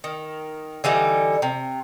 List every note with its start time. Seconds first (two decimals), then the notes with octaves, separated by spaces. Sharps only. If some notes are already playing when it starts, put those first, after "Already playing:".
0.04 D#3
0.84 D3 E3 G3 D#4
1.42 C3